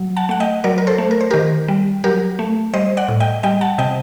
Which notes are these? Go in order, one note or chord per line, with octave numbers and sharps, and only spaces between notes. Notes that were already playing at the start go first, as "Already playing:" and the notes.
Already playing: F#3
F#5 A5
A3 F#5
D#5 G5
F#3 A#4 D5
A#4
A4 C5
A3
A#4
C5
D#3 G4 A#4
G3
F#3 G4 A#4
A3
G3 C5 D#5
D5 F#5
A2
D#5 G5
G3 D#5 G5
F#5 A5
C3 D#5 G5